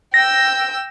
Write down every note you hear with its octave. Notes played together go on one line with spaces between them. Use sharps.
G5 E6 A#6